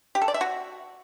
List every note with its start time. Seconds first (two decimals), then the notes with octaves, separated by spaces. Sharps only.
0.15 G4
0.21 A4
0.28 D5
0.34 E5
0.41 F#4